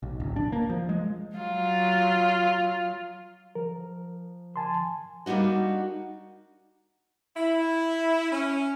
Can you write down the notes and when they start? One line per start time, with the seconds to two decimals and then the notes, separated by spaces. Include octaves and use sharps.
0.03 B1
0.20 D1
0.36 D4
0.52 A#3
0.70 F3
0.89 G#3
1.37 F#3 F4
3.55 F3 A#4
4.56 G#5 A5 C6
5.26 G3 A#3 D4 D#4 F#4
7.36 E4
8.32 C#4